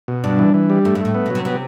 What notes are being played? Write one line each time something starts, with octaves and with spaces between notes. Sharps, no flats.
B2
G2 D4
E3
E3
G3
G2 A3
G2
A2 A3
B3
B2
C3 F#3
C3 B3